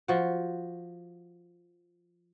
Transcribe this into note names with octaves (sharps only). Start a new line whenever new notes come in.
F3 F#4